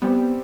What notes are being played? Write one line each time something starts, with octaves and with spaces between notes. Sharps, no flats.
G3 B3 C4 G4